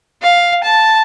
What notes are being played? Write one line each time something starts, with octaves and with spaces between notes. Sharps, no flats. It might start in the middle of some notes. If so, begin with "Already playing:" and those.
F5
A5